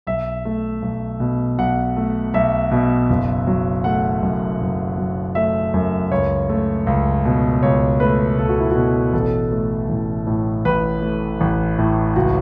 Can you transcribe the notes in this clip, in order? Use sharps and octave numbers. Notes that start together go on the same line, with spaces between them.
B1 E5
A3
B1
B2
B1 F#5
A3
B1 E5
B2
F#1
F#3
A3 F#5
F#2
F#1
F#3
A3 E5
F#2
C#2 C#5
A3
C#2
B2
C#2 C#5
A3 B4
C#2 A4
F#4
E4
B2 F#4
A1 A4
A3
A1
A2
A1 B4
A3
A1
A2
C#2 F#4